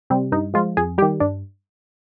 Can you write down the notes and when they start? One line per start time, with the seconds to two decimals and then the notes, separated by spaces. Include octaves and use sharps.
0.10 C3 G3 C4
0.32 G2 D#4
0.54 F3 G#3 F4
0.77 F2 G#4
0.98 G3 G4
1.02 D#3
1.20 G2 D4